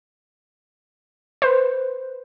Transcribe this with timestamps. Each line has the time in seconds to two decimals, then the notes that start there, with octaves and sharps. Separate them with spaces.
1.42 B4 C5